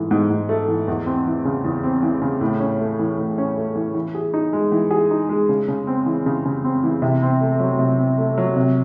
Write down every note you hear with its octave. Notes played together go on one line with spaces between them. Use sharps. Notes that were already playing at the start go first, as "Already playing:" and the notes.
Already playing: G#2 E3 A3
G#2
G#2
A3
E3
E2
C4
E3
C#3
E2
C4
E3
C#3
A2
C#4
A3
E3
A2
C#4
A3
E3
E3
G#4
D#4
G#3
E3
G#4
D#4
G#3
C#3
C#3
C4
E3
C#3
C#3
C4
E3
C3
C4
A3
F#3
C3
C4
A3
F#3
C3